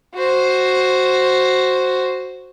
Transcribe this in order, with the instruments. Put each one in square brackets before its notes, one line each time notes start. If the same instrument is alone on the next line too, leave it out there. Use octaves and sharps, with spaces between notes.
[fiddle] F#4 C5